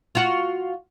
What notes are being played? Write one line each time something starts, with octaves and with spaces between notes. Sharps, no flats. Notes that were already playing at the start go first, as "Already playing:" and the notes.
F4 F#4